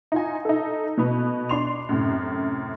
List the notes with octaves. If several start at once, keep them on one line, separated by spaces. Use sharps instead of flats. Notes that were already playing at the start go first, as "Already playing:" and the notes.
D#4 F4 G#5
D#4 A4
B2 B3
D4 C6 F7
F#2 A2 C3